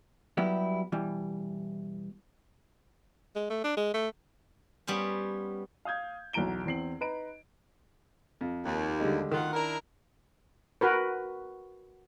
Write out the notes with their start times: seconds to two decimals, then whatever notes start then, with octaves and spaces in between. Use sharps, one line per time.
0.37 F#3 G3 B3 E4 G4
0.92 B2 E3 G3
3.35 G#3
3.50 A3
3.64 D4
3.77 G#3
3.94 A3
4.87 G3 B3 C#4 C5
5.85 F5 D#6 G6 G#6
6.33 B1 E2 F#3 A#5 D7 G7
6.65 E2 C4 C7 F#7
7.01 D#4 B4 A#5 D7
8.41 F2
8.65 D#2
9.00 D3 G3 G#3
9.31 D2 D#3 F4 F#5
9.52 D4 E4 A#4
10.81 F#4 A#4 B4